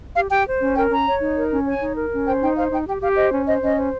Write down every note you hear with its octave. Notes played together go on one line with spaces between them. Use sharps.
G4 F5
G4 G5
C5
C#4
A#4 G5
C#4 A#5
C#5
D#4
A#4
C#4
C#5 G#5
D#4
A#4
C#4
C5 G5
D#4 G5
C5 F5
D#4 G5
G4 G5
G4 F5
C5 D#5
C#4
C5 D#5
C#4 D#5
C5